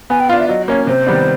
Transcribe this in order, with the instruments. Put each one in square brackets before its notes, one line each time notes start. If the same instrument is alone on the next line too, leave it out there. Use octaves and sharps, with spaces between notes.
[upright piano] B3 [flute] G#5
[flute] G5
[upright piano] D4 F4 [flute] F5
[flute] E5
[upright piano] F#3 [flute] D#5
[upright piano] A#3 C#4 [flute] C#5
[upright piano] C3 [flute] C5
[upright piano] D#3 G3 B3 D4